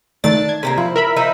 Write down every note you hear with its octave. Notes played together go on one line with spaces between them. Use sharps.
D#3 A3 D4 A6
G#6
C3 A3 A#3
F3 E4
A#4 E5 B5
F3 D#4 E4